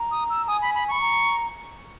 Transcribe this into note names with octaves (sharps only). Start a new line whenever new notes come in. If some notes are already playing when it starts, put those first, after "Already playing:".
Already playing: A#5
D#6
E6
G#5 D#6
B5
B5
B5 C#6
A#5